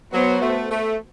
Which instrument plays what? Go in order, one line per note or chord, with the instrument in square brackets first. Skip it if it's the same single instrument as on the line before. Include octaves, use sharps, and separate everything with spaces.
[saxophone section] F#3 [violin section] B3 F#4 C5
[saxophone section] A3
A3